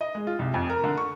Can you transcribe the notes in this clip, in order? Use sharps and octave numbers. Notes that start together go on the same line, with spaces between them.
D#5
G#3
F4
C2
F2
A#4
D3
C#6